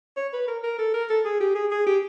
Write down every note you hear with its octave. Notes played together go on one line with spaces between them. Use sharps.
C#5
B4
A#4
A#4
A4
A#4
A4
G#4
G4
G#4
G#4
G4